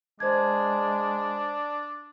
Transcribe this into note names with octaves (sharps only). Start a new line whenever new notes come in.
G#3 D4 C5 D5 A5 G#6